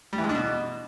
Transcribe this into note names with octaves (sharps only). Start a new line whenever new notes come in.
G3
E3
G#3
D4
B2